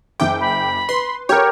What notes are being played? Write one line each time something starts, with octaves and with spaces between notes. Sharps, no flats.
F#1 E5 G5 D6
B5
B4 C6
G4 A#4 C#5